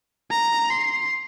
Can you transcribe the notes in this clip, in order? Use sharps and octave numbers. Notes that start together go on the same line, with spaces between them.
A#5
C6